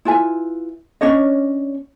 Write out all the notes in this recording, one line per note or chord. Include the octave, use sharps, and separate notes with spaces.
E4 F4 B4 G#5
C#4 D4 C#5 D#5